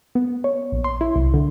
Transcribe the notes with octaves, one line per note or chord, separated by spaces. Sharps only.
B3
C#5
A#1
C6
E4
C2
D3